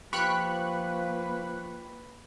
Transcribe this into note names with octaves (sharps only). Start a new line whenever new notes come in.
F3 A#3 F4 G4 B4 B5 C#6 F#6